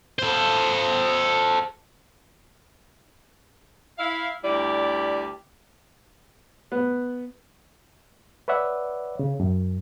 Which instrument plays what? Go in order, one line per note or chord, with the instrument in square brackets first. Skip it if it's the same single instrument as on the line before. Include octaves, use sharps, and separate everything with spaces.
[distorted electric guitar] A4 C5
[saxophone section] E4 F5
D2 G3 E4 D5
[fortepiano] B3
[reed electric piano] B4 C#5 D5 E5 F#5
C#3
F#2